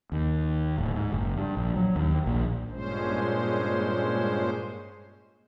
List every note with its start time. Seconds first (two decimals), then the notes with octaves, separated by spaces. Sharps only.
0.12 D#2
0.78 D1
0.96 G#2
1.12 F#1
1.37 G2
1.57 A#1
1.76 F#3
1.96 D#2
2.26 A#1
2.71 G2 A#2 G#3 C#4 C5